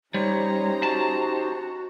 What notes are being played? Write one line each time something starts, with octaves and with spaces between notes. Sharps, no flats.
G3 C#4 D#4 G4 C5 C#5 A#5
F#4 A5